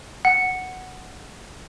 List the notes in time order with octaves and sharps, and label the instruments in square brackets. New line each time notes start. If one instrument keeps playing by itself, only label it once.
[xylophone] F#5